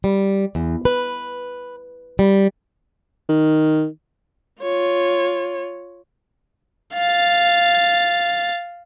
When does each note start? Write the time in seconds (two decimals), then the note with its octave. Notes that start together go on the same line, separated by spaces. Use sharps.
0.04 G3
0.55 E2
0.85 B4
2.19 G3
3.29 D#3
4.62 F4 C#5
6.94 F5 A6